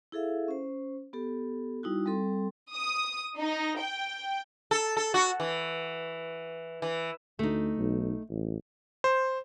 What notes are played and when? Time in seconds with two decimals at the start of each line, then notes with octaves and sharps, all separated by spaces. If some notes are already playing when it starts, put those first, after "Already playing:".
0.12 E4 G#4 A4 E5 F5
0.48 C#4 C5
1.13 B3 G4 A4
1.83 G3 D#4 E4 F#4
2.06 G3 C4 A4 C6
2.73 D#6
3.39 D#4
3.79 G5
4.71 A4
4.97 A4
5.14 F#4
5.40 E3
6.82 E3
7.39 D2 A3 D#4
7.77 B1
8.30 A1
9.04 C5